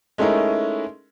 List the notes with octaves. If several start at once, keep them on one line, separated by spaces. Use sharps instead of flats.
G#3 A3 C#4 D#4 E4 A#4